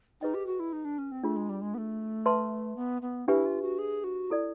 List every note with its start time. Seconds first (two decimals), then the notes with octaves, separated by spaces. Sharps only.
0.21 D#4 G#4 B4 D#5 G5
0.34 G4
0.46 F#4
0.59 E4
0.72 D#4
0.85 D4
0.98 C#4
1.11 C4
1.24 A3 D4 F4 G#4
1.36 G#3
1.49 G3
1.61 G#3
1.74 B3
1.78 A3
2.26 B4 E5 A5 C6
2.76 B3
3.02 B3
3.28 D4 E4 G4 B4 E5 G#5
3.45 F4
3.62 F#4
3.78 G#4
4.04 F#4
4.30 E4 A4 D5